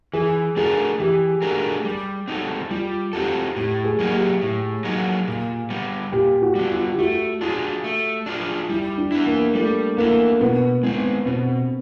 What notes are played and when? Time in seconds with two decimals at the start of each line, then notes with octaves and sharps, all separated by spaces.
0.13 E3 G#4
0.56 A3 D4 F#4 G#4 A#4
0.99 E3 G4
1.42 A3 D4 F#4 A#4
1.85 G3
2.28 C4 D#4 F#4 A4
2.70 G3 F4
3.13 C4 D#4 F#4 G4 A4
3.56 A2 G4
3.84 G#4
3.99 F#3 A#3 D#4 F#4
4.13 G4
4.42 A2
4.84 F#3 A#3 D#4 F#4
5.28 A#2
5.70 G3 B3
6.12 A#2 G4
6.42 F#4
6.55 G3 B3
6.71 F4
6.92 G4
6.98 A3 F#4
7.41 D4 F4 F#4 G#4
7.84 A3
8.26 D4 F4 G#4
8.69 G3 E4
8.98 D4
9.12 B3 E4
9.27 A#3
9.55 G3 A3
9.98 A#3 B3 E4
10.41 B2 B3
10.83 G#3 B3 C4
11.26 B2 C4